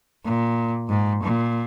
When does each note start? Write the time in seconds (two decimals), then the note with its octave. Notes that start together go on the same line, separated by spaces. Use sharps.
0.25 A#2
0.89 G#2
1.23 A#2